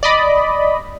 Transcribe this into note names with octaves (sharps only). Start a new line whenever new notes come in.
D5 D#5 B5